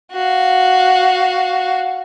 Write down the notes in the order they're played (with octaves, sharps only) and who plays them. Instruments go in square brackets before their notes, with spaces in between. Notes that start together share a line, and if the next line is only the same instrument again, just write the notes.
[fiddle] F#4 F5